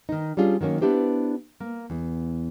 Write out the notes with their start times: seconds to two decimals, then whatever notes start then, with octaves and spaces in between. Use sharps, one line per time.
0.09 D#3 D#4
0.37 G3 C#4 D4 F4 G#4
0.61 D#3 F#3 A#3 C#4
0.81 B3 D4 E4 G4 C5
1.60 A#3
1.90 E2